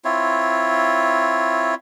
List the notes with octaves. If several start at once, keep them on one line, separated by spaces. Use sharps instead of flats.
C4 E4 F4 C#5